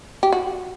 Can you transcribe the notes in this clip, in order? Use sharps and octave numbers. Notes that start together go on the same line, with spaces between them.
G4
F#4